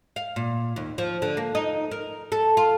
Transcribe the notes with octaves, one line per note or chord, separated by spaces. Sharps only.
F5
A#2
D#2
F3
D3
A#3
D#4
A#4
A4
F4